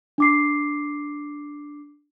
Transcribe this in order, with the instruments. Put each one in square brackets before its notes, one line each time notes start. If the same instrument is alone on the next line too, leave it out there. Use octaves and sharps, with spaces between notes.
[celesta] D4 D6 C7